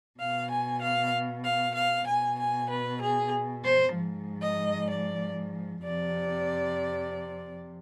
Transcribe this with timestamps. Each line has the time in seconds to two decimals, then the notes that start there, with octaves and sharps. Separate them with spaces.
0.19 B2 F5
0.49 G#5
0.81 F5
1.44 F5
1.75 F5
2.07 B2 G#5
2.38 G#5
2.69 B4
3.00 G#4
3.64 C5
3.95 G#2 F3
4.42 D#5
4.89 D5
5.83 F2 C3 F3 D5